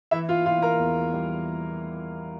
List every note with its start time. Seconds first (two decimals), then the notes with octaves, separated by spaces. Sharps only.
0.11 E3 E4 E5
0.29 F4 F5
0.46 E3 F4 F5
0.62 A#4 A#5
0.80 E2
1.13 G3